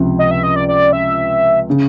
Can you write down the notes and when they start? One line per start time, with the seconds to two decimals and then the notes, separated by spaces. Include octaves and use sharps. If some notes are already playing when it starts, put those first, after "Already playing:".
Already playing: C#2 C3 F3
0.19 D#5
0.31 E5
0.43 D#5
0.56 D5
0.68 D5
0.93 E5
1.70 C#3